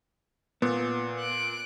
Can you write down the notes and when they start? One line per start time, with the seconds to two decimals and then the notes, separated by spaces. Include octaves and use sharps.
0.62 A#2 B3
1.19 F#6 D7